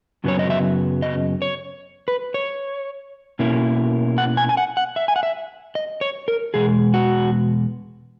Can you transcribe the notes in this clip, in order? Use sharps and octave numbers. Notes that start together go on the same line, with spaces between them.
F#2 C#3 F#3 B3 C#5
D#5
E5
D#5
C#5
B4
C#5
B2 A#3 C#4 E4
F#5
G#5
G#5
F#5
F#5
E5
G#5
F#5
E5
D#5
C#5
A#4
E2 B2 G#3 G#4
F#4